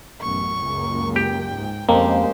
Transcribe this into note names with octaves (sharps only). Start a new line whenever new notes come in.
A1 F#2 B2 C#6
C#2 F#2 A#3
G4 G5
G#2
F1 F2 G#3 A#3 C#4 G4 C5